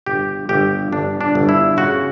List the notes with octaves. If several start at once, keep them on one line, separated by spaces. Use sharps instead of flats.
G1 G4
G1 G4
G1 D4
D4
G1
E4
C#3 F#4